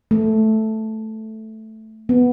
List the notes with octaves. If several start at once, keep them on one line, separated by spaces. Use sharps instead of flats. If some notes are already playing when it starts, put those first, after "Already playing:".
A3
B3